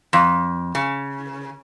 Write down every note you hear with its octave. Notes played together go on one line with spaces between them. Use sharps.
F2
C#3